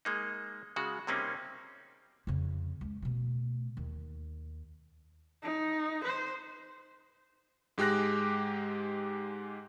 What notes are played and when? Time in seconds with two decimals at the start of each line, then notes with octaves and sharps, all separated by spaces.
0.05 G#3 A#3 D#4
0.76 C#3 G#3 F#4
1.07 C3 G3 A#3 C4 C#4 D#4
2.27 F2 C#3
2.81 C#2
3.02 B2 A3
3.77 D#2
5.43 D#4
6.04 C5
7.78 G#2 G#3 G4 D6 F#6 A#6